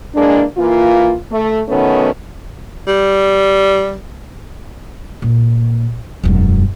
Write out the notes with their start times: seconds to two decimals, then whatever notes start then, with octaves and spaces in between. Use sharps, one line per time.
0.15 E3 G#3 A#3 D4
0.57 E3 A#3 F4
1.31 A3
1.69 B2 D#3 A3 B3 C#4
2.87 G3
5.22 A#2
6.23 E1 F#2